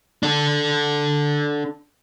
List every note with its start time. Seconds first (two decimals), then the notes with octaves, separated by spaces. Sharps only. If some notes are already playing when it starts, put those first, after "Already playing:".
0.23 D4 A4